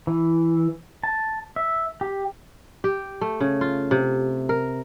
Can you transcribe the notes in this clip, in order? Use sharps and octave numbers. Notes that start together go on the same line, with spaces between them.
E3
A5
E5
G4
G4
A3
C#3
F4
C3
A#4